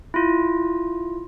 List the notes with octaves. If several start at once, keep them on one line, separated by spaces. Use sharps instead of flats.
E4 F4